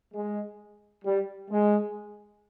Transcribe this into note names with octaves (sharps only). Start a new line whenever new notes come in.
G#3
G3
G#3